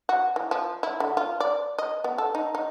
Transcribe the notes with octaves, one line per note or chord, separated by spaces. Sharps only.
F#4
E3
F3
E4
D3
F4
D5
D#5
B3
A4
D#4
D#4